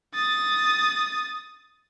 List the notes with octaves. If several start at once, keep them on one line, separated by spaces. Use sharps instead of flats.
D#6 A6